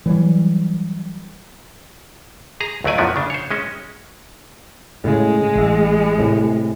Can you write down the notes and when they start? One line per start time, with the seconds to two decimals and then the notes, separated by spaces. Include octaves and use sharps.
0.06 E3 F#3 G3
2.61 G#4 A#5
2.84 C#2 F#3 A3 D5 G#5
2.98 F#2 F3 F#3 A3 B3 E4
3.16 C#3 D4
3.30 C5 C#5
3.51 G#3 C#4 D#5
5.04 A2 C#3 G#3
5.56 A1 E5
6.18 A2 C3